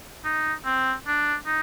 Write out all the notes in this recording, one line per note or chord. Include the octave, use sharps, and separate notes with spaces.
D#4
C4
D4
D#4